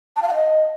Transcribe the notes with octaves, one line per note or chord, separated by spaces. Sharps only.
A5
F5
F#5
D#5